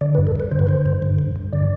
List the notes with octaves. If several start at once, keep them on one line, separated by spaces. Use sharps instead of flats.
D3 D5
B4
G2
A4
G2 B4
D3 C5
B4
D3 C5
G2
D3
G2
G2
D3 D5